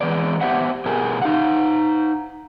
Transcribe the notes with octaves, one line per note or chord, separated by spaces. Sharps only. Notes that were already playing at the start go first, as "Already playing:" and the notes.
E3 G#3 B3 D5
B3 G4 C5 E5 F#5
B2 G4 G#4 A#4 G#5
D#4 F5 F#5